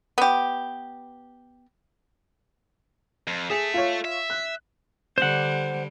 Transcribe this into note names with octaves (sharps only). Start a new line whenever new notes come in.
B3 G4
F2
G#4 A4 E5
F4 C#5
E5
F#6
D3 G3 C5 F#5